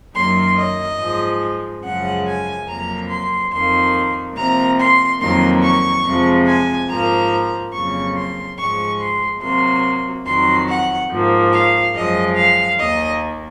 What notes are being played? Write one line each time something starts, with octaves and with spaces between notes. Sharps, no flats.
F#2 D#3 F#3 A#3 C6
D#5
G#2 F3 G#3
F#2 C#3 F3 G#3 F#5
G#5
F2 C3 F#3 A#3 A#5
C6
F2 D#3 A#3 C6
C3 F3 A#3 A#5
C6
F2 D#3 F#3 A#3 C6
C#6
F2 C3 F3 G#3
G#5
G#2 F3 A#3 A#5
F2 C#3 F#3 A#3 C#6
C6
G#2 F3 G#3 C#6
C6
C3 F#3 A#3 C6
F2 D#3 F#3 C6
F#5
G#2 F3 A#3
F5
F#2 F3 G#3 D#5
F5
D#2 D#3 A#3 D#5